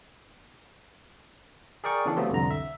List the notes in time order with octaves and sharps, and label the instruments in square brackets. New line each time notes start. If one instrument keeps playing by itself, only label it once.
[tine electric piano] G#4 A#4 D5 G5 C#6
C#3 E3 B3 D4 A4
F#3 A3 B3 C4 F4 G4
C2 F2 D3 A#5
E5